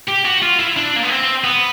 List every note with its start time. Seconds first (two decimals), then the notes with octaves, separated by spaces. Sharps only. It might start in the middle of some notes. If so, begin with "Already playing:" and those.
0.09 G4
0.26 F#4
0.43 F4
0.60 E4
0.77 D4
0.96 A#3
1.03 B3
1.10 C4
1.44 B3